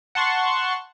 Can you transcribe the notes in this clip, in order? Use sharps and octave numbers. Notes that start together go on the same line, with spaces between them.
F#5 A5 C6 C#6